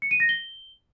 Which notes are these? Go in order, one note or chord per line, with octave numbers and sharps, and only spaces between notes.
C#7
D#7
A#6
G7